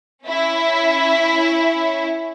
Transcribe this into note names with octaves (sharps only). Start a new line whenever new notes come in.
C#4 E4